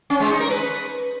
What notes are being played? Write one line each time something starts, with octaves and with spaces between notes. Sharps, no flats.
C#4
G#3
D#4
A#4
B4